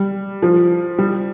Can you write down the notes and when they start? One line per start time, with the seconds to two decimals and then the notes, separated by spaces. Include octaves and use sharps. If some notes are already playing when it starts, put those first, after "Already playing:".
Already playing: G3
0.42 F3
0.98 G3